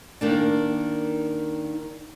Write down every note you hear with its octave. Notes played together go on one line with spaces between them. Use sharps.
D#3 A#3 D4